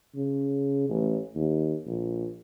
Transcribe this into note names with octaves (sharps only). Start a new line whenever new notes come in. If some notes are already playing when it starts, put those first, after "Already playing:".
C#3
A1
D#2
A#1